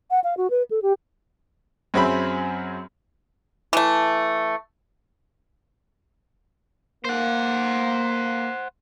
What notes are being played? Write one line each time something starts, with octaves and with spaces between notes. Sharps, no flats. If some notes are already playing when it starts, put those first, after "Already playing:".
F#5
F5
F#4
B4
A4
G4
F#2 F#3 C4 G#4 E5 B5
E3 A3
A#3 C5 F#5